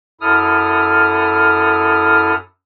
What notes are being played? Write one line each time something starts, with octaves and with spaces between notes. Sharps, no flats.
F#2 E4 A4 D#6 F6